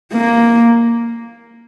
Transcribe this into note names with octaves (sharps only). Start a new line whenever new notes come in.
A#3